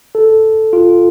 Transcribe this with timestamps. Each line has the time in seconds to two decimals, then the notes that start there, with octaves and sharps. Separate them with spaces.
0.15 A4
0.73 F4